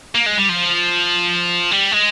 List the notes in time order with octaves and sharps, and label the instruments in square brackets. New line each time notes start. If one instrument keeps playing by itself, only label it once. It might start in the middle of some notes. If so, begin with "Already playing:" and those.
[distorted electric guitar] A#3
G#3
G3
F3
G3
G#3